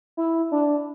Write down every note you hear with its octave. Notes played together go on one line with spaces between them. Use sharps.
E4
D4